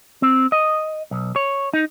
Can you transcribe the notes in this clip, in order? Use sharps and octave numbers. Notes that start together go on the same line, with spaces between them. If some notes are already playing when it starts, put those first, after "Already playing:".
C4
D#5
B1
C#5
D#4